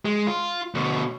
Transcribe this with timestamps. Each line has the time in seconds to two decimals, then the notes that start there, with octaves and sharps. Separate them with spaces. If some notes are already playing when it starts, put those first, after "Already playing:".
0.05 G#3
0.27 F4
0.75 D2 B2